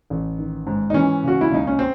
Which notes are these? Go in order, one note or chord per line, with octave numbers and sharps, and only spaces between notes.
A1
D#3
G#2
D#4
E3 C#4
C#3 F#4
E4
C#2 D#4
C#4
C4